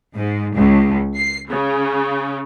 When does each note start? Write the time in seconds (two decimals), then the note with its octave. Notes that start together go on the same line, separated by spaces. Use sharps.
0.15 G#2
0.55 C#2
1.15 C7
1.50 C#3